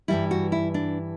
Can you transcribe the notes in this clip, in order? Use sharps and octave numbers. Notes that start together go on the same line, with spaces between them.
G2 E3 G3 E4
F#4
E4
D4